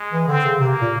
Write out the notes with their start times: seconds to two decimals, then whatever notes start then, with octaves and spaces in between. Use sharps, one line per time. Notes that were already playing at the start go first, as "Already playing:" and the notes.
Already playing: G#3
0.13 E3
0.28 D3 C4
0.45 C#3
0.60 C3 A#3
0.81 A#2